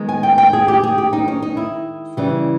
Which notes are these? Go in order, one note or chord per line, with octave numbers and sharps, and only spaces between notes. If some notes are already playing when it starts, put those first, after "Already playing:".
Already playing: D#3 G#3 B3
G#5
G5
G5
G#4
G4
G#4
G4
D#4
C#4
D#4
E4
C#3 E3 G3